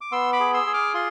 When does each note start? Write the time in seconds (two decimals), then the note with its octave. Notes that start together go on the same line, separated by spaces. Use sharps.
0.01 D6
0.12 B3 C6 E6
0.33 B5 D6
0.40 G#4
0.54 C6 E6
0.67 G#4
0.74 D6 F6
0.94 F4 C6